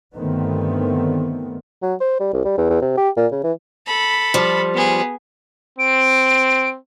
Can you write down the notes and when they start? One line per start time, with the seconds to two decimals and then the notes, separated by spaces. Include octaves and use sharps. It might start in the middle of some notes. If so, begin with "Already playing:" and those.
0.14 G2 D3 D#3 A3 B3 C4
1.82 F#3
2.01 C5
2.20 G3
2.33 C2
2.45 G3
2.58 E2
2.70 E2
2.82 C3
2.97 G4
3.17 A#2
3.32 C#3
3.44 E3
3.87 A4 B5
4.34 F3 G3
4.74 B3 G#4
5.78 C4 D7